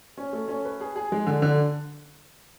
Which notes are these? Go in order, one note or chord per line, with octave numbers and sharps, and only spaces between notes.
C#4
A3
C#4
B4
G#4
G#4
G#3
D3
D3